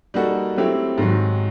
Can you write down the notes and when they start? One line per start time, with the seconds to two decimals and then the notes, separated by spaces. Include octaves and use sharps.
0.14 G3 A#3 D#4 F#4 A4
0.56 F#3 A3 C4 E4 G4
0.98 G#2 D#3 F#3